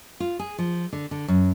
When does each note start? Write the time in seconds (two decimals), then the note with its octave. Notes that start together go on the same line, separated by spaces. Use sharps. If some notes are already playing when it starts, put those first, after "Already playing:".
0.20 F4
0.39 G#4
0.58 F3
0.93 D3
1.11 D3
1.28 F#2